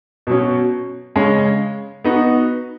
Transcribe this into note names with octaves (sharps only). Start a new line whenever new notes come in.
B2 F#3 C#4
C#3 G#3 C#4
B3 D#4 F#4